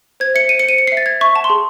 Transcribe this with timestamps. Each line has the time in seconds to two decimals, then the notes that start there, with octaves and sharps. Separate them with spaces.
0.20 C5 G#6
0.34 E5 C#7
0.49 C5 D#7
0.59 C#7
0.63 C5
0.69 D#7
0.77 C5 C#7
0.87 C7
0.92 E5
0.97 A6
1.06 E5 G#6
1.21 E5 C#6
1.35 F#5 A5
1.44 C6
1.50 G#4